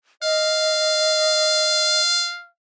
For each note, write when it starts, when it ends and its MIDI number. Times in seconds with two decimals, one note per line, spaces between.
0.23 2.01 75
0.23 2.48 77